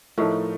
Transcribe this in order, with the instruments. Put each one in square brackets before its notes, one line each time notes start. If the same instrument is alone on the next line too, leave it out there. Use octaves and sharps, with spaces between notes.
[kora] A2 [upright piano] F3 A3 D#4 A#4